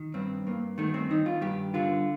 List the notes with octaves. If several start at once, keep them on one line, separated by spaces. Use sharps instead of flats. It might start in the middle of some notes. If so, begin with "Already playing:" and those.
Already playing: D#3
G2 C4
G2 A#3
D#3 A3
C4
D#3 D#4
F4
G2 G4
D3 F4